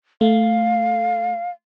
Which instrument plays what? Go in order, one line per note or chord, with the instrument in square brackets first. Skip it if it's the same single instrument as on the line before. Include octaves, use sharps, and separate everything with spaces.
[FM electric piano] A3 [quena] F5